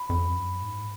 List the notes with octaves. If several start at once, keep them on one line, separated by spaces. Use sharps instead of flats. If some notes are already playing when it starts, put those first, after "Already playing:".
Already playing: B5
F2
F#2
G#2